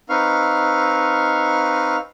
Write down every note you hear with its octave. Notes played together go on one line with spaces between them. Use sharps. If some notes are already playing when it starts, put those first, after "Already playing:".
C4 D#4 B4 F5 C#6 F6